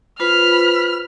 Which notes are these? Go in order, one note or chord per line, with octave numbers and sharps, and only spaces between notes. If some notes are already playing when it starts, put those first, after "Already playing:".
F4 B4 C5 B5 F6